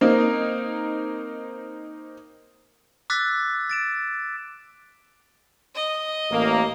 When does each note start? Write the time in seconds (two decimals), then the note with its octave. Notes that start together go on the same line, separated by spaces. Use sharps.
0.01 A#3 C4 D#4
3.10 D6 E6 F#6 A6 B6
3.69 A6 D7 E7
5.75 D#5
6.30 A1 A#3